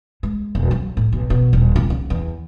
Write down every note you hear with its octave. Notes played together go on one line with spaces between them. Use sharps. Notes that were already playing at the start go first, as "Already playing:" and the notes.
G#3
E1
F#3
A2
B1
B2
D#1
C#2
C#3
E2